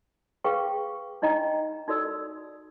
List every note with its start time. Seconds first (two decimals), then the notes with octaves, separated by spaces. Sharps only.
0.44 G#4 B4 F5 G5 C#6
1.22 D4 D#4 D#5 G5 A#5
1.88 D#4 F#4 A4 D5 E6